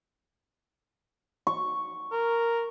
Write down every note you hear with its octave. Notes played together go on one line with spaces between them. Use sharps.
C#6
A#4